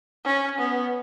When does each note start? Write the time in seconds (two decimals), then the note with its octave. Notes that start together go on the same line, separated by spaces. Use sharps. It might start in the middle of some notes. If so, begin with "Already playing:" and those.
0.25 C#4
0.59 B3